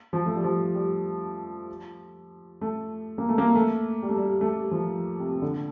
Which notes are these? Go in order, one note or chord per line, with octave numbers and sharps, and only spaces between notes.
F3
A3
G3
F3
G3
A3
A#3
A3
A#3
A3
G3
A3
G3
A3
G3
F3
C3
D3